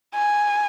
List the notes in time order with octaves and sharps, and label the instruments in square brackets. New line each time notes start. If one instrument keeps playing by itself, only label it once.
[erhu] G#5